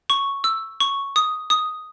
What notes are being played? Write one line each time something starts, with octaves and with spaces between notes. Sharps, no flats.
C#6
E6
C#6
D#6
D#6